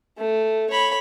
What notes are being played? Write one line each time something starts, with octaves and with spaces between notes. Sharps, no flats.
A3
C#5 B5